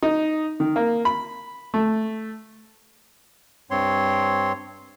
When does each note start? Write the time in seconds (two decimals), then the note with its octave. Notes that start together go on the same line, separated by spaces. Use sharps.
0.02 D#4
0.60 D#3
0.76 A#3
1.05 B5
1.74 A3
3.71 G2 C4 C#5 C6